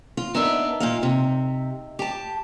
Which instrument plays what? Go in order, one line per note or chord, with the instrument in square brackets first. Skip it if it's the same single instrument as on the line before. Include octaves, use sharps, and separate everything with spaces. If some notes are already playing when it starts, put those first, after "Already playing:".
[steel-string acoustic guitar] F4
[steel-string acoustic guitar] B3 D4 [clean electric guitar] D#4 A#4 E5
[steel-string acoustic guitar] A#2 A#3 F5
C3
G4 A5